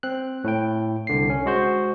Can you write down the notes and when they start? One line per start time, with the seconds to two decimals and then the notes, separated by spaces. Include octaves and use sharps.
0.03 C4 F#6
0.44 A2 E4 G5
1.07 C2 D3 C7
1.30 C#4
1.46 G#3 F#4 C5